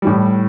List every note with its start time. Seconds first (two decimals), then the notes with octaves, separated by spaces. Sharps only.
0.02 A2 E3 G3